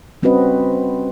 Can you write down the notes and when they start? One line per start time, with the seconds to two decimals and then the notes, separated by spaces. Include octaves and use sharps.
0.23 G3 C4 C#4 F#4 B4 D#5